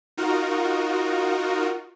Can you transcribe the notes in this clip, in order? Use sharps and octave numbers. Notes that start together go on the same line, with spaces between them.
D#4 F4 F#4 A#4